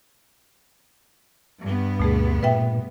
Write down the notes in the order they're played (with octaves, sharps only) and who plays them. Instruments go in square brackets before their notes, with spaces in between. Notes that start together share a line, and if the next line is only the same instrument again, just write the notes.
[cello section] G2 B3
[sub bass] D2 [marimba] B2 A3 G#4
[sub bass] A#2 [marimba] B4 E5 G5